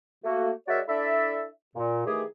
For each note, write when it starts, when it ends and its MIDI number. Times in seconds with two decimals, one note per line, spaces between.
0.24 0.50 57
0.24 0.50 58
0.24 0.50 66
0.68 0.80 56
0.68 0.80 66
0.68 0.80 70
0.68 0.80 73
0.68 0.80 74
0.68 0.80 76
0.87 1.45 62
0.87 1.45 64
0.87 1.45 69
0.87 1.45 74
0.87 1.45 76
1.75 2.05 46
2.06 2.23 51
2.06 2.23 52
2.06 2.23 57
2.06 2.23 67
2.06 2.23 68